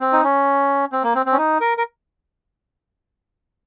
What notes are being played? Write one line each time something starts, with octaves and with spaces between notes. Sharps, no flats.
C4
D#4
C#4
C4
A#3
C4
C4
C#4
D#4
A#4
A#4